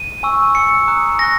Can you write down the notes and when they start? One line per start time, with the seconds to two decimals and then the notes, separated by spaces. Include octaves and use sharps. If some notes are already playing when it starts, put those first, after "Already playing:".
Already playing: D#7
0.23 G#5 C#6 E6
0.55 G#5 C#6 E6 C#7
0.88 A#5 D#6 F#6
1.19 G#5 C#6 F#6 A#6